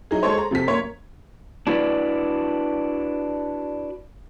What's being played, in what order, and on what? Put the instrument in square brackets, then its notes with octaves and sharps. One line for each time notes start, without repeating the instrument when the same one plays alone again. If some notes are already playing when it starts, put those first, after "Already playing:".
[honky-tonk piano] F#3 D#4 E4 G#4
G#3 A4 C5 C#5
A#5
C3 F3 A4 B6
F#2 A#3 C#5
[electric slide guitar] D4 E4 F#4 B4 D5